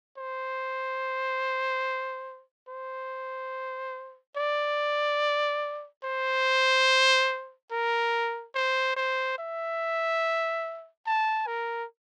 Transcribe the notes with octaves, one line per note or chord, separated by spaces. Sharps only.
C5
C5
D5
C5
A#4
C5
C5
E5
A5
A#4